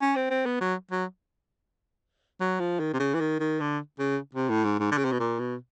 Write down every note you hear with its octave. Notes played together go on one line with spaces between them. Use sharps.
C#4
C4
C4
B3
F#3
F#3
F#3
F3
D#3
C3
C#3
E3
D#3
D#3
D3
C#3
C3
A2
G#2
G#2
D3
C#3
C3
B2
A#2
B2